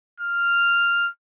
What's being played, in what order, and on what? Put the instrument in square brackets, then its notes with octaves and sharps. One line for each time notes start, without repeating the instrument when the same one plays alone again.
[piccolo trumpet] F6